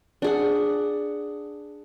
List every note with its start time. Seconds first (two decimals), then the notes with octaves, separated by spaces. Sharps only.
0.22 D4 G#4 F#5